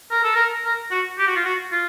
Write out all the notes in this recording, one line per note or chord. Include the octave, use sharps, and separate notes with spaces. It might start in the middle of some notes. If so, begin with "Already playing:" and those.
A#4
A4
A#4
A#4
F#4
G4
F#4
F4
F#4
F4